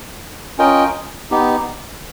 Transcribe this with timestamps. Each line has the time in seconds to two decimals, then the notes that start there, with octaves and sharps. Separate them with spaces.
0.58 C#4 F4 A#4 D#5 G5
1.31 B3 D#4 G4